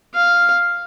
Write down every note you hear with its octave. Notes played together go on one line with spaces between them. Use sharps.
F5